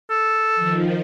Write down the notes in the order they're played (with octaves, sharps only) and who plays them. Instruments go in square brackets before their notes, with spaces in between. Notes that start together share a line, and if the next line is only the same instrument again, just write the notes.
[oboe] A4
[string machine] D#3 F3